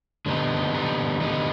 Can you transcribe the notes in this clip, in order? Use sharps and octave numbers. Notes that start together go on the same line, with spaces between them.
D3 G3 B3 D#4
D3 G3 B3 D#4
D3 G3 B3 D#4